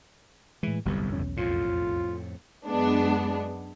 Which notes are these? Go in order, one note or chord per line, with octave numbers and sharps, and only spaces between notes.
A2 E3 G#3
G1 C2 F2 F#3 G3 B3
B1 E2 C#4
F2 A2 F4
F#2 G#3 B3 D4